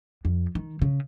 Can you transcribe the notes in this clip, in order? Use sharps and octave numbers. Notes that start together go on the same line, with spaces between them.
F2
D#3
C#3